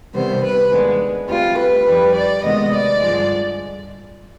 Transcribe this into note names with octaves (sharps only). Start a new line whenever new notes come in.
C3 D#3 G3 B3 C5
B4
D#2 D3 G#3 B3
D2 C3 G3 F4
B4
F2 D#3 G3
D5
D2 C3 D#3 G#3 B3 D#5
D5
G2 D3 F3 G#3